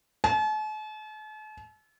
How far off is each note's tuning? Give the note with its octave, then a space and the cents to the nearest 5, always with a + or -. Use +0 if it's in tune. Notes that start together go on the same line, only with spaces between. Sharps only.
A5 -45